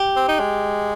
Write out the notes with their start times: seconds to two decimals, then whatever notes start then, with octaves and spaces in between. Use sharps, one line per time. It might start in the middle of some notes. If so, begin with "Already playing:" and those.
Already playing: G4
0.16 C4
0.28 D#4
0.40 G#3